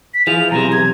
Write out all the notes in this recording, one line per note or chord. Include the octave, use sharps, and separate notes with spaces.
B6
E3 F3 G#4 F7
B1 C3 A#5
G#6